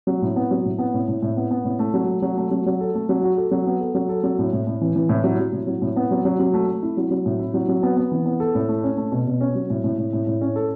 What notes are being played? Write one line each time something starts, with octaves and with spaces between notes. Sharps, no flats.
F#3
A2
B3
F#3
A2
B3
A2
A2
A2
B3
B3
A2
A3
F#3
A3
F#3
A3
F#3
F#3
A4
A3
F#3
F#4
A4
F#3
B3
A4
F#3
A4
F#3
A2
A2
A2
E3
E3
A2
F#3
F#3
A2
F#3
A2
B3
F#3
F#3
F#3
A3
A3
E4
F#3
F#3
A2
E4
F#3
F#3
B3
B3
E3
B3
A4
A2
A3
C#4
A3
B2
B2
C#4
F#3
A2
A2
A2
A2
A2
C#4
A4